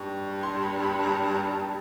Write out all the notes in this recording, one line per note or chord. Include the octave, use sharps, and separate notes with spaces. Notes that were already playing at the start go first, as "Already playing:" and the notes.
Already playing: G2 C#6
C6
B5
B5
A5
A#5
A5